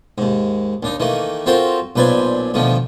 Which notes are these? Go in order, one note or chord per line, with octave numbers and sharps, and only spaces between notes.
D#2 G#2
D#2 D4 D#4
D#3 E3 A3 A#3
C4 F4 F#4 A4 A#4 C5
B1 A#2 B4 C5 D5 G#5
D2 B2 D3 D#3 F3